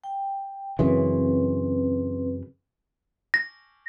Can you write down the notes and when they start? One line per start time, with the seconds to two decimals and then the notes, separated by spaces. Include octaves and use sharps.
0.04 G5
0.79 F#2 C#3 E3 C4 B4
3.34 A#6